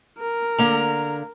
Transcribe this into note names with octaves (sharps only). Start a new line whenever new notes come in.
A#4
D3 A#3 A#5